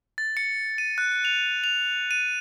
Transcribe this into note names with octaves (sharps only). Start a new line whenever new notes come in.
A6
C#7
D#7
F#6
F7
F7
D#7